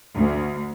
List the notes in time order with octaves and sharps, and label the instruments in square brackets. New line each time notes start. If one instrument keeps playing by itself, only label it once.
[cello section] D2